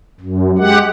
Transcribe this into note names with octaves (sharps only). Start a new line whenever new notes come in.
F#2
G#3 G4 F#5